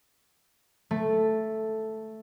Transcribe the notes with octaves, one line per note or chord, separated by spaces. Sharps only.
A3